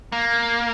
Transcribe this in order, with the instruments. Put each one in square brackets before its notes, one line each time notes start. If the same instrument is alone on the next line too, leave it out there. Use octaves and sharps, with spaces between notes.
[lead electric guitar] A#3